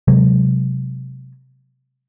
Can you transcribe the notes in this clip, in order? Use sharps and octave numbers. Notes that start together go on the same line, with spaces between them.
C3 F#3 G#3